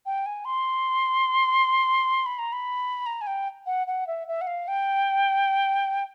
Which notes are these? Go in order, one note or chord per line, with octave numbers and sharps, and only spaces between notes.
G5
G#5
C6
B5
A#5
B5
A#5
G#5
G5
F#5
F#5
E5
E5
F#5
F5
G5